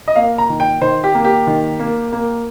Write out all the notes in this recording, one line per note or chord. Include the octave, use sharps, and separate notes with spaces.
D#5
A#3 F5
A#5
D#3
G5
D#3 C5
G4
A#3
G4
D#3
A#3
A#3